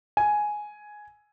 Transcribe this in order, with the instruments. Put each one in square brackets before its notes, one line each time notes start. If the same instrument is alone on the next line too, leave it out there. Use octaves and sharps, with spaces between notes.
[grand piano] G#5